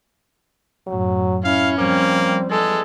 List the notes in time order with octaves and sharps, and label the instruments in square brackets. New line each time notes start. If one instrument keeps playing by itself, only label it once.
[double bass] F#2 A2 [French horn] F#3
[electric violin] C#4 [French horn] E4 [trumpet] F5
[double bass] F3 G3 [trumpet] A#3 [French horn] C4
[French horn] E2 [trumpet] G#3 [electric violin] A4